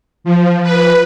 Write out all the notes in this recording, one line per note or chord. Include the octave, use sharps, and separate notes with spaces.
F3
B4